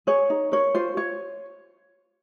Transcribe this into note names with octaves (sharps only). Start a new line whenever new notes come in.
G#4 C#5
D#4
A#4 C#5
F4 C5
F4 C#5